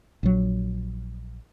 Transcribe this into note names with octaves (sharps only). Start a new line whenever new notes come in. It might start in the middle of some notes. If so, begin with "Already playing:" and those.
A#1 F#3